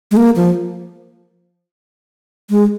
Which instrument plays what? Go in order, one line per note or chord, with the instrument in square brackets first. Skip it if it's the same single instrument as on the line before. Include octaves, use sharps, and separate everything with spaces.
[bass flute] G#3
A#3
F3
G#3